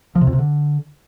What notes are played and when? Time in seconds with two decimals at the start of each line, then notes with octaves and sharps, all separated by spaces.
0.15 F3
0.21 C3
0.27 F2
0.33 C3
0.39 D3